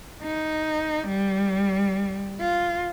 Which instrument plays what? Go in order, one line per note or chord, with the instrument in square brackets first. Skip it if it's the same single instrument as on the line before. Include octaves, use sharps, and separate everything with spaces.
[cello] D#4
G3
F4